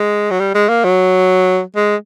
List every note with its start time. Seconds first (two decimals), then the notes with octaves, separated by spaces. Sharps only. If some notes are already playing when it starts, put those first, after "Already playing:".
Already playing: G#3
0.31 F#3
0.40 G3
0.55 G#3
0.69 A#3
0.84 F#3
1.76 G#3